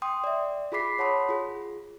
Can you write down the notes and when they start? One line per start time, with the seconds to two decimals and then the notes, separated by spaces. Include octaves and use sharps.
0.02 G5 C6 D#6
0.24 D5 E5
0.72 F4 G#4 B5 D6 B6 C7
0.99 C#5 F#5 A5 B5 C6 D#6
1.29 F4 G#4